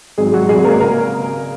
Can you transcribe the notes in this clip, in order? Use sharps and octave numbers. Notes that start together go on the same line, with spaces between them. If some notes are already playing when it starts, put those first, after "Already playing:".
G#1 G#2 F#3 G#3 G#4
F#3 F#4
G#1 G#2 F#3 G#3 G#4
A#3 A#4
C#3 A#3 A#4